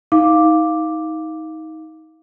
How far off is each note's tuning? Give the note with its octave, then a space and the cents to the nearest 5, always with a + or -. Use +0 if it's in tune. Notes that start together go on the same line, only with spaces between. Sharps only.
D#4 +25 F5 +0 D6 +0